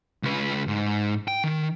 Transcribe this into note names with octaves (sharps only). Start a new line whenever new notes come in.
C#2 B4
G#2
G5
D#3